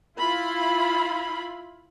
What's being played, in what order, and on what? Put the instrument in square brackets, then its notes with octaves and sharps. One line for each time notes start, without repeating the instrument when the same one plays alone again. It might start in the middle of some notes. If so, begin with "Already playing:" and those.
[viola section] E4 F4 B5